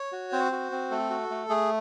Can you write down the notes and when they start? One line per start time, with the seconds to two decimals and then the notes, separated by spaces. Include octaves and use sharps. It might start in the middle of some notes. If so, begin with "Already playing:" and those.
Already playing: C#5
0.12 F#4
0.32 C4 C5
0.52 F#4
0.72 C4
0.91 A3 A4
1.10 F#4
1.31 A3
1.50 A3 G#4